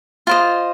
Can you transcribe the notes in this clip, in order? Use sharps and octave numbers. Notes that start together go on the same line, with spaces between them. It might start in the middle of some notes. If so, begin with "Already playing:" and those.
F4 C5 D#5